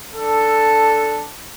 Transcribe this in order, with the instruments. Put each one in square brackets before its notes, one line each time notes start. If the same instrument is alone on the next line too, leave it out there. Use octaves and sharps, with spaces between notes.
[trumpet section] D4 A4